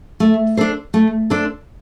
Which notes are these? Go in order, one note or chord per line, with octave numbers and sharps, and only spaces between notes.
A3
D4 A4 C5
A3
D4 A4 C5